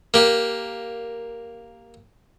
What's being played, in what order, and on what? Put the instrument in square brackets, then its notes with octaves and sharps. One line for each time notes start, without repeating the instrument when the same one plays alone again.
[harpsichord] A#3 G4